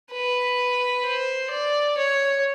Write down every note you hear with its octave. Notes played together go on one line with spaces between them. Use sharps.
B4
C5
D5
C#5